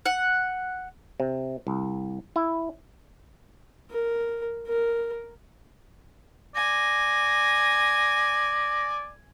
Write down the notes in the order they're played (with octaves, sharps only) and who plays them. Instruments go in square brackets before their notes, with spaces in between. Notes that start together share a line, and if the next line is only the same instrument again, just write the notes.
[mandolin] F#5
[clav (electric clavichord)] C3
C2
E4
[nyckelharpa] A#4
A#4
[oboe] D5 [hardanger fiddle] G#5 [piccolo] A#6